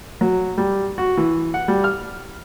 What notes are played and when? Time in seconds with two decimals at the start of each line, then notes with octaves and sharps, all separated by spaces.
0.21 F#3
0.58 G3
0.98 F#4
1.17 E3
1.54 F#5
1.68 G3
1.84 F6